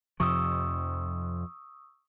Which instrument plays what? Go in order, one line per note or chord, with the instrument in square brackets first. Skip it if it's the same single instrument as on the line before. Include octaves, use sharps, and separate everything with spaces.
[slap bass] F2 C3 F3 [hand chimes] C#6 D#6 E6